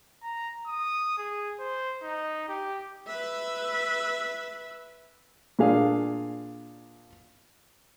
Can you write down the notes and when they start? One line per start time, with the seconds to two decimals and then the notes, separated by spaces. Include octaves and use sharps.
0.23 A#5
0.67 D#6
1.18 G#4
1.60 C5
2.03 D#4
2.49 G4
3.07 B4 E5
5.59 A#2 D4 G#4 F5